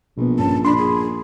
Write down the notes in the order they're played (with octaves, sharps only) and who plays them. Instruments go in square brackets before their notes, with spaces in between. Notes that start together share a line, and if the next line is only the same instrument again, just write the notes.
[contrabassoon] A#1 [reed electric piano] B2 B3
[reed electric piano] G2 C#4 [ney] A5
[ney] D4 [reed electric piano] B5 C6
[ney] G#4